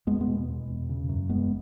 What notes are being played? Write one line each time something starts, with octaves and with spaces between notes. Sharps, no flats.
E2 G#3 B3
G#3 B3
B2
B2
E2
C#3
F#2
F#1 G#3 B3